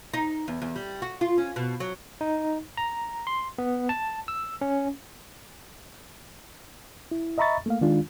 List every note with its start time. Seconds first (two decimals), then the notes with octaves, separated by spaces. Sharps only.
0.14 D#4
0.48 E2
0.62 E2
0.76 G3
1.02 F#4
1.21 F4
1.38 C#4
1.56 B2
1.80 F#3
2.21 D#4
2.77 A#5
3.27 C6
3.58 B3
3.89 A5
4.28 E6
4.61 C#4
7.11 E4
7.38 D#5 E5 A#5 B5 C#6 A6
7.66 A3 A#3 F5
7.81 D#3 G#3 D4 F4